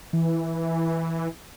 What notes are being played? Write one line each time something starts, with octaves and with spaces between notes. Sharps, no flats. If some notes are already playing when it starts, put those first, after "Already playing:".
E3